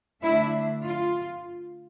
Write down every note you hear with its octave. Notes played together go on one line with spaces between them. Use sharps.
D3 A3 D4 E4 E5
F4